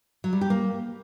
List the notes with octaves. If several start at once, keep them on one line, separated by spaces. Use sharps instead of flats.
F#3
G3
G4
A#3